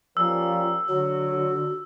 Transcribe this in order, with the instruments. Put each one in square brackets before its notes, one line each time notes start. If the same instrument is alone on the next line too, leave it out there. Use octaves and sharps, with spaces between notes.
[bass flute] F3 [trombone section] G3 A#3 C#4 [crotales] E6
[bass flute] D3 [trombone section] F#3 [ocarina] F#4